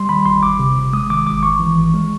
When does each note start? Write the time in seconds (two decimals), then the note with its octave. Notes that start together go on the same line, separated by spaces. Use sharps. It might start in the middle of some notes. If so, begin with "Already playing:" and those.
Already playing: G3 C6
0.09 D#3 B5
0.26 G1 C6
0.43 G1 D6
0.59 C3
0.76 G1
0.93 G#3 D#6
1.10 D#3 D6
1.27 G#1 D6
1.43 G#1 C#6
1.60 E3
1.76 G#1
1.94 G#3